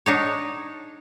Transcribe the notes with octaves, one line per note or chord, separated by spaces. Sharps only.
D4 D#4 C#5